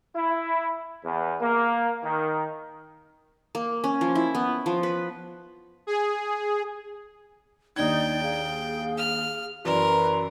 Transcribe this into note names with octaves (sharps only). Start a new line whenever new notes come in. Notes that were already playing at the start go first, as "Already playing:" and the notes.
E4
E2
A#3
D#3
A#3
C#4
F3
E4
B3
F3
B4
G#4
D#2 D4 D#4 D5 G5 G#6
G#4 F5
F6
F#2 E3 A#4 B4 D5 C6